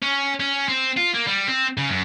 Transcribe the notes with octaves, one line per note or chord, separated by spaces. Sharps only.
C#4
C#4
C4
F4
A#3
G3
C4
C#3
F#2